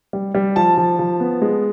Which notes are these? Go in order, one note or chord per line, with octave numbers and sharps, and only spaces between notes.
G3
G3
F3 A5
F3
F3
B3
G#3